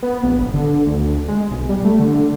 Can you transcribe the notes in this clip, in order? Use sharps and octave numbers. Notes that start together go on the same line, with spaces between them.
B3
A#1
G1
D3
D2
G#3
B1
G3
A3
D3